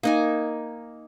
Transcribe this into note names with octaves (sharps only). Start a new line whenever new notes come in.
A#3 D#4 G#5